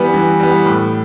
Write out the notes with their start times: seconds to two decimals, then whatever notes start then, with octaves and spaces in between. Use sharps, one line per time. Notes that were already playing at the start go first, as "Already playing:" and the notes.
Already playing: E3 G3 B3
0.14 E3
0.40 G3 B3
0.66 A2